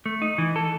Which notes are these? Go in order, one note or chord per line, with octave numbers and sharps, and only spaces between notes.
A3
D#4
E3
A4